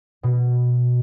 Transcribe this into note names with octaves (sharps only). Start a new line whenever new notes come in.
B2